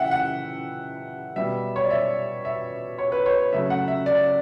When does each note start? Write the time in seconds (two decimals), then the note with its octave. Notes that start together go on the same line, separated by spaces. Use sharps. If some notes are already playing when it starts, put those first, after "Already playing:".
Already playing: C#3 E3 A3 E5 F#5 G5
0.11 F#5
1.36 B2 G3 E5
1.76 C#5
1.84 D5
1.90 E5
2.45 E5
2.98 C#5
3.12 B4
3.26 C#5
3.52 C#3 F#3 A3 E5
3.70 F#5
3.88 E5
4.06 D5